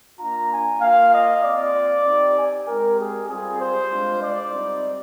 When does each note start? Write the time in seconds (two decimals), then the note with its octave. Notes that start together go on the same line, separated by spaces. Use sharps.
0.19 A#3 D4 F4 A#5
0.51 G#5
0.81 A#3 F4 F5
1.12 D#5
1.43 C4 F4 D5
2.05 C4 D#4 G4
2.36 G#5
2.66 G#3 C4 G4 A#4
2.98 G#4
3.29 G3 C4 F4 G#4
3.60 C5
3.90 G#3 D4 F4
4.21 D5
4.52 G3 C4 D#4